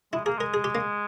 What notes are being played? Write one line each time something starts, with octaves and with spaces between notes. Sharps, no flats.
G#3 E4
A#3 G#4
G#3 A#4
G#4
G4
A#3